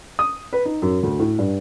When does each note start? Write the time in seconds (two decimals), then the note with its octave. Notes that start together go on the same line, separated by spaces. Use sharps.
0.19 D#6
0.53 B4
0.65 D#4
0.82 F#2
1.03 D2
1.19 A2
1.39 G2